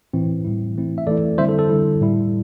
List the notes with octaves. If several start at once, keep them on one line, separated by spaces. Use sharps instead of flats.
A2 E3 C4 E4
A2 G3 E4
E3 A3 C4 E4
E5
E3 A3 E4 A4 D5
D3 G3 C4 E4 C5 E5
A4
A4
D3 G3 E4
A2 G3 E4